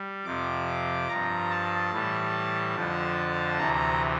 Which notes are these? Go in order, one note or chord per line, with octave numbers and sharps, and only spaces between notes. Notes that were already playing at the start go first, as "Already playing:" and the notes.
Already playing: G3
F2 C3 F3 D6
G2 F3 A#5
A5
A2 E3 G3
F2 D3 F3
D2 C3 E3 A#5